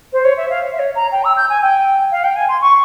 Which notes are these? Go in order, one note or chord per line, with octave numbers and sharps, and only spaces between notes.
C5
C#5
E5
F5
E5
C#5
A#5
G5
E6
G6
G#5
G5
F5
G5
G#5
C6
C#6